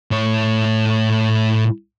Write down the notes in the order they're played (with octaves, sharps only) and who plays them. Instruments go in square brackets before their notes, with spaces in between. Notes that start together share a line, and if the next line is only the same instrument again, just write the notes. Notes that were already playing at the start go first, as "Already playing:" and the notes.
[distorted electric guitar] A2 C#5